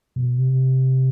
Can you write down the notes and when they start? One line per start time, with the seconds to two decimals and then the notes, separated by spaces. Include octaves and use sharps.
0.16 B2
0.38 C3